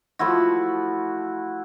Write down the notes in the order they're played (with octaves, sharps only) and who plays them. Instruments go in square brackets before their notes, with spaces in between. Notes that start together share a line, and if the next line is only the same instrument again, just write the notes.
[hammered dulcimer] F3 A3 E4 F#4